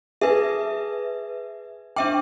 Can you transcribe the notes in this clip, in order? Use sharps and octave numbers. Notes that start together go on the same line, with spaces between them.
G#4 B4 E5
D4 E5 G5 D6